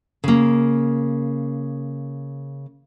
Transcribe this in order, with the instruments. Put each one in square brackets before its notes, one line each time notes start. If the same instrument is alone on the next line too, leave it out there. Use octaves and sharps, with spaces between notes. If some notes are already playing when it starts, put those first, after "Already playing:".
[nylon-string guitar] C#3 A#3